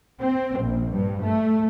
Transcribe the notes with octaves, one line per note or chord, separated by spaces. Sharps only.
C4
A#1
G2
A3